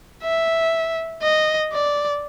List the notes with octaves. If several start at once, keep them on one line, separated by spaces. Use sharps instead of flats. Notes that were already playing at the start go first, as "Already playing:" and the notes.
E5
D#5
D5